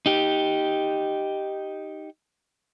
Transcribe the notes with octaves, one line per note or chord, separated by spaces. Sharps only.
D#4 G4